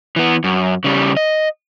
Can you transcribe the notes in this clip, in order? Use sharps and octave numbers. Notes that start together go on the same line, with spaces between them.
E3 B3
F#2
C#3 G3
D#5